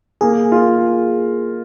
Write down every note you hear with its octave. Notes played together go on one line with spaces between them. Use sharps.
A#3 G#4
F4